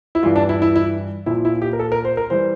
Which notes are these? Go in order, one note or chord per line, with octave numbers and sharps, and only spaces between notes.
E4
G2 E3 G3 F4
D4
E4
E4
E4
A#2 F3 E4
E4
G4
A#4
A4
A#4
C5
A#4
E3 G3 C5